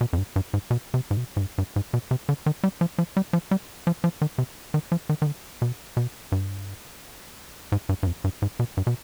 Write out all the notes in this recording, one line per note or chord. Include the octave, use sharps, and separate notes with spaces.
B2
F2
G2
G2
G#2
B2
C3
G#2
B2
G#2
G2
G2
G#2
B2
C3
D3
D#3
G3
F3
F3
G3
F3
G3
F3
F3
D#3
C3
D#3
F3
D#3
D#3
D3
B2
B2
G2
G#2
G2
G2
F2
G2
G#2
B2
G2
B2